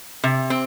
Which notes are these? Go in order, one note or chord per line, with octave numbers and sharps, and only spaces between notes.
C3
C4